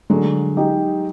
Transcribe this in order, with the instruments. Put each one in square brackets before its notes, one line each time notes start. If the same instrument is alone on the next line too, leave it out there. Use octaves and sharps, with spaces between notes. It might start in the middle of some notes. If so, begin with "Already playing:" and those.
[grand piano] D3 [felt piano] F#3 G#3
[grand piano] D#4 G4